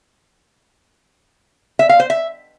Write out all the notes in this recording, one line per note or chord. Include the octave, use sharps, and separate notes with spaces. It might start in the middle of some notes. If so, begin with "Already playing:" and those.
E5
F5
C5
E5